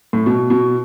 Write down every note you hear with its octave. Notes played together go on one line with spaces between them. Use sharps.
A2
B2
B2